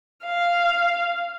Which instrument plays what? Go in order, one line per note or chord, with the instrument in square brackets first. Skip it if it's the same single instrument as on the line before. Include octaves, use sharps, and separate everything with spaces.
[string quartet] F5